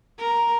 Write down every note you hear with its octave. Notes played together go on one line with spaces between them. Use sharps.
A#4